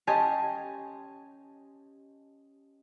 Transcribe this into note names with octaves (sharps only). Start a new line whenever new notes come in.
C#4 G4 D#5 G#5 A5 C6